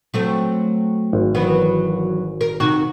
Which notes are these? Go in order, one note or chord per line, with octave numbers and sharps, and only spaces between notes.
F#3 A3 C4
G#1
E3 F#3 B3
A#4
C3 D#3 F#4